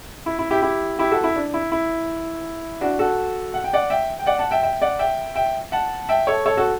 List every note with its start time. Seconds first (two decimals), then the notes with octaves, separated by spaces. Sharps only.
0.26 E4
0.39 E4
0.51 E4 G4
0.62 E4 G4
0.99 E4 G4
1.11 F#4 A4
1.24 E4
1.36 D4
1.54 E4
1.72 E4
2.81 D4 F#4
2.99 F#4 A4
3.54 F#5
3.64 G5
3.73 D5 F#5
3.90 E5 G5
4.19 G5
4.26 D5 F#5
4.39 F#5 A5
4.51 E5 G5
4.63 E5 G5
4.82 D5 F#5
4.99 E5 G5
5.35 E5 G5
5.72 F#5 A5
6.09 E5 G5
6.27 A4 C#5
6.46 A4 C#5
6.57 F#4 A4